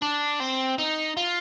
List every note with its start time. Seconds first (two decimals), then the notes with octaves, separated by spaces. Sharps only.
0.02 D4
0.40 C4
0.78 D#4
1.17 F4